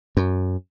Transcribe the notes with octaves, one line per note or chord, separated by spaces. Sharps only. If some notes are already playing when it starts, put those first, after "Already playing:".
F#2